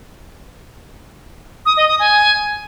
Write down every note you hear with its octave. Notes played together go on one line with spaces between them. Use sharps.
D#6
D#5
D#6
G#5